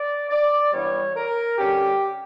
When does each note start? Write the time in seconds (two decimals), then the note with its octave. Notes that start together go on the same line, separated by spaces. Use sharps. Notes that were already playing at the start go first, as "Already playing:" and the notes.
Already playing: D5
0.30 D5
0.72 G2 E3 G3 B3 C#5
1.16 A#4
1.58 D3 G3 C#4 G4